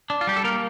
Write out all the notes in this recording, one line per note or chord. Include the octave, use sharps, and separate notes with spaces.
D4
F4
G3 G4
A4
A#3 A#4